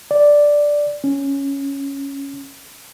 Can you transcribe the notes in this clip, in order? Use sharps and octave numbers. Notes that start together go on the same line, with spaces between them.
D5
C#4